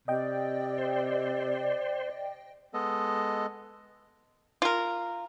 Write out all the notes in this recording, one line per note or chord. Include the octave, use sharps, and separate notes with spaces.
C3 D5 D#5 G5
C5
G#3 B3 A4 D#5
F4 A#4